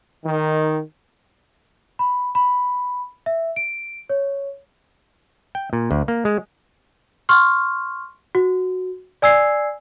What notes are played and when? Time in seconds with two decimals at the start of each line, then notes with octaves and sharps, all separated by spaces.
0.24 D#3
1.99 B5
2.35 B5
3.26 E5
3.56 D7
4.10 C#5
5.55 G5
5.73 A#2
5.91 D2
6.08 A#3
6.25 G#3
7.29 C6 C#6 F6
8.35 F#4
9.22 D5 G#5 E6 G#6 C7